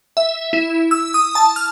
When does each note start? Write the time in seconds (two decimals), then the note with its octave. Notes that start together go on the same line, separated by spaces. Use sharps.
0.17 E5
0.53 E4
0.91 E6
1.14 D#6
1.35 A5
1.56 F6